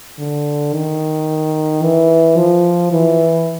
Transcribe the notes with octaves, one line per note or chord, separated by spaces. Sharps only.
D3
D#3
E3
F3
E3